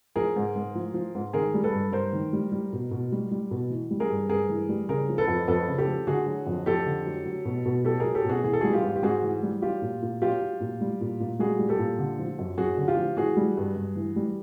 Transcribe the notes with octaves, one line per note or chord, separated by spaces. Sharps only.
F3 G#4 A#4
G#2
G#2
F3
F3
G#2
D#3 G#4 A#4
G3
A4 B4
G2
G2 A#4 C5
D#3
G3
G3
B2
B2
G3
G3
B2
E3
G3
G#4 A#4
G2
G2 G#4 A#4
E3
G3
C#3 G#4 A#4
F3
A4 B4
F2
F2 A4 B4
C#3
G4 A4
F3
D3 F#4 G#4
F#3
F2
F2 G4 A4
D3
F#3
F#3
B2
B2
F#3 G4 A4
F#3 G#4 A#4
G4 A4
B2
F#4 G#4
E3 G#4
A4
G3 F#4 G#4
F4 G4
G#2
G4
G#2 F#4 G#4
E3
G3
F#3 F4 G4
A#2
A#2
F#3 F4 G4
F#3
A#2
G3
A#2
A#2
G3 F#4 G#4
G3
G4 A4
A#2
D3
F3
F#2
F#2 F#4 G#4
D3
F4 G4
F3
E3 F#4 G#4
G3
G2
G2
E3
G3